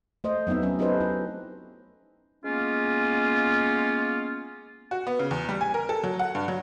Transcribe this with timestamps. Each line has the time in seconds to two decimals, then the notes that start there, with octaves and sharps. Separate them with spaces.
0.24 A3 C5 D#5
0.47 F#3 B3 C4 D#4 E5
0.62 F#3 C#4
0.79 C#4 D#4 G4 A4 B4 C5
1.00 E4
2.44 G#3 A#3 B3 C#4 F4
4.91 F#4
5.07 B3
5.19 C#3
5.31 E2
5.49 G3
5.61 G#5
5.74 A#4
5.89 A4
6.04 F#3
6.19 F#5
6.35 G2
6.48 F#3